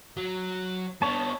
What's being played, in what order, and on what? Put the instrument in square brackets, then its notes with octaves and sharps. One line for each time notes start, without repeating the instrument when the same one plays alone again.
[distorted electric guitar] F#3
[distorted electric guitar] B3 D4 [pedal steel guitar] C#5 A5